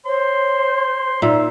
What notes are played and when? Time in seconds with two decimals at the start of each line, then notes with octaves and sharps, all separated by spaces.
0.05 C5 C#5 C6
1.22 A#2 D#4 E5